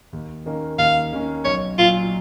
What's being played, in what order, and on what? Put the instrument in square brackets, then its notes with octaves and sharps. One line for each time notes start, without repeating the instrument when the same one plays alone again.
[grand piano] D#2
D#3 A#3 C#4
[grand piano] D#2 [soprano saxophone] F5
[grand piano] D#3 A#3 C#4
[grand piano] B1 [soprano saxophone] C#5
[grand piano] A#2 F#3 [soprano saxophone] F4